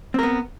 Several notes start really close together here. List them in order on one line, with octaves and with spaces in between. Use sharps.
C4 A#4 B3